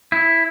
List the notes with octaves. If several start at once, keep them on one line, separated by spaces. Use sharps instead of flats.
E4